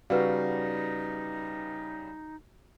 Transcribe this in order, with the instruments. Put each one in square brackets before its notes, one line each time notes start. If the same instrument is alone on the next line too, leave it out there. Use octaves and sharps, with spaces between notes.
[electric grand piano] C#3 G3 [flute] D#4 [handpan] F#4 F5 [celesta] B4 D5